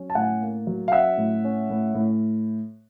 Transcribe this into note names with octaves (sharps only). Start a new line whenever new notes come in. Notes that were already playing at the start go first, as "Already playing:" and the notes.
Already playing: F#3 C#4
A5
A2 F#5 G#5
A#3
F#3
F5
C#4 E5 F#5
A2
C#4
A2
A2